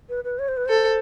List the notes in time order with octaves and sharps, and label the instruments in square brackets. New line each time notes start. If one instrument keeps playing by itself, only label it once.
[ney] B4
B4
C#5
C5
B4
[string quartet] A4 [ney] C5